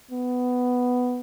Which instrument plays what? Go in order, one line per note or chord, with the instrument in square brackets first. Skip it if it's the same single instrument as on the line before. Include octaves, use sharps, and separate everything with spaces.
[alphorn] B3